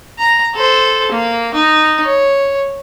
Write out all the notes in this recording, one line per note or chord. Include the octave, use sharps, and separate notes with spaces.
A#5
A4 C5
A#3
D#4
C#5